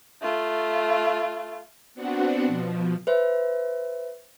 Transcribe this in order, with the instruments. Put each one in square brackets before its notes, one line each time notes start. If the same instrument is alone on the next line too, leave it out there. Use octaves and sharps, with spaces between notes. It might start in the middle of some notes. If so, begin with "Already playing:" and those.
[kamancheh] A3 F4
[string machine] B3 C4 D4 F#4 F#5
B2 F3
[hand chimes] B4 C5 E5